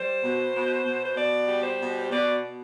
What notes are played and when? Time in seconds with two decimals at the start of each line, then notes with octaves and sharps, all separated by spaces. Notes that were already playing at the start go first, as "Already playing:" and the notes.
Already playing: G3 C5
0.23 B2
0.53 B2
0.85 B2
1.05 C5
1.16 B2 D5
1.48 G3
1.63 C5
1.79 B2
2.00 C5
2.10 B2 D5
2.41 B2